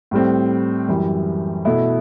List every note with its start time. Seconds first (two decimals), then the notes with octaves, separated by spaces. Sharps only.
0.11 A2 G3 C4
0.88 F#2 E3 G3
1.65 B2 A3 E4